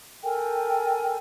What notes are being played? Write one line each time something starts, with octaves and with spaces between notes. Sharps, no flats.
A4 A#4 G5 G#5